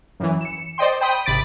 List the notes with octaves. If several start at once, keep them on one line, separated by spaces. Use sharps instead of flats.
F#2 E3
C#7 E7
C5 D5 D#5 G5 C6
C5 G5 B5 D#6 G6
G#1 C3 B5 D6 A6 D7